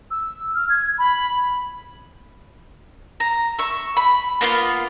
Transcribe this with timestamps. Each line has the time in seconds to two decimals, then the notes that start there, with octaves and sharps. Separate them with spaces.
0.11 E6
0.55 F6
0.69 G#6
0.99 B5
3.20 A#5
3.59 E5 C#6
3.97 B5
4.41 A#3 B3 E4 F4